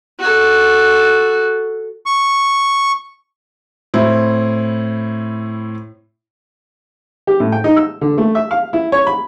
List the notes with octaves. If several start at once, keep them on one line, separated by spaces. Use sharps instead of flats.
F#4 A4
C#6
A2 C4 E4
G4
A2
G5
D#4
E6
D3
A3
E5
F5
E4
C#5
B5